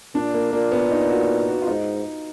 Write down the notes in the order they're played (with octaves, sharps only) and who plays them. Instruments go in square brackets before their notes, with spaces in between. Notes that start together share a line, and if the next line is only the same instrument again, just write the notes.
[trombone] A#2 [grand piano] D4
[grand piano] A#3
[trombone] A#2 [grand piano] A#3
[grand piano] B3
D#4
F#4
F#4
F4
[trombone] G#2 [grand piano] D#4